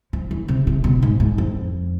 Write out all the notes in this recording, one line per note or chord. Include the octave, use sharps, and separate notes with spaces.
F3
E3
C3
C3
B2
G#2
G#2
F2